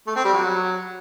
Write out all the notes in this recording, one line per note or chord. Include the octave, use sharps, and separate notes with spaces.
A3
C4
G3
F#3